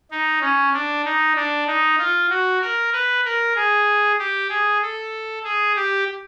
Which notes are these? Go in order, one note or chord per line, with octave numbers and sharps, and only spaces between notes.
D#4
C#4
D4
D#4
D4
D#4
F4
F#4
A#4
B4
A#4
G#4
G4
G#4
A4
G#4
G4